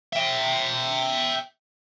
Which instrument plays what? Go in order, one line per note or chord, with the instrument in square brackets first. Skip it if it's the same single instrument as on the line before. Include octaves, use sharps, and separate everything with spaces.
[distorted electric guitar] E5 G5